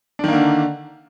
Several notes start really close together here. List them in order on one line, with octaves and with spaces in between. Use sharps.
D4 D#3 A#3 D3